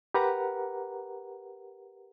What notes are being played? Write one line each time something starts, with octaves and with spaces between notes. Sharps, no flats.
G4 A#4 B4 F#5 A#5